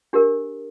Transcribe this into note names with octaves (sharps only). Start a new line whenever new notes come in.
D4 G4 A#4